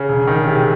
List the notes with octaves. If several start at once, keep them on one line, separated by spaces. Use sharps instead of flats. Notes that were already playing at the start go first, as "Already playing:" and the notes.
Already playing: C#3
E1
D#3
C3